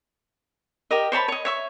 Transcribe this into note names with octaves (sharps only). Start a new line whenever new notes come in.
G4 A#4 D#5
C5 C#5 A5 B5
C#5 D#5
C#5 E5 C#6